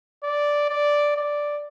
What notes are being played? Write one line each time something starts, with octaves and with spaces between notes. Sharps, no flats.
D5
D5
D5